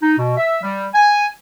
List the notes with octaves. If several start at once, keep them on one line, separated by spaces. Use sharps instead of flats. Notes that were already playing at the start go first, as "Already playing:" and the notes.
D#4
B2
E5
G3
G#5